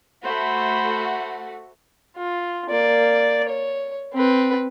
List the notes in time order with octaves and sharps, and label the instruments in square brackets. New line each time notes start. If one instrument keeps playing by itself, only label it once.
[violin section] A3 F#4 [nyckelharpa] C5 B5
[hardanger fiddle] F4
A#3 D5
C#5
C4 B4